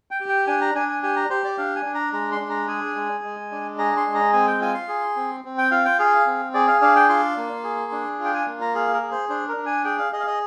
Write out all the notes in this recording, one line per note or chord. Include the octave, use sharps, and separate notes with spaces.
G5
G4
G5
D4 G#5
A#5
D4 G#5
G#5
G4 G#5
A#5
G4 C5
D5
D4 F5
G#5
D4
A#5
G#3 A#5
C6
D4
A#5
G#4 G#5
G#3
G#3
D4
G#4 A#5
C6
G#3
A#5
C4 G#5
G5
F4 G#5
C6
G#4
C4
C4
G5
F4 F5
G5
G#4 F5
C4
G#4 D5
F5
D4 F5
G5
F4 C6
A#3
G#4
D4
F4
G5
G#5
A#3
A#5
G#4 F5
A#4
G#4
C5
D4 C5
A#4
D4
G#5
G#4 G5
F5
G#4 D#5
F5
D#5